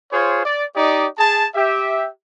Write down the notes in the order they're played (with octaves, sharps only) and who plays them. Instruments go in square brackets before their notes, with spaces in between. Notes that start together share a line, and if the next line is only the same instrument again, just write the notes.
[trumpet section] F4 G#4 C5 C#5
D5
D#4 G4 D5 D#5
G#4 A5
G4 E5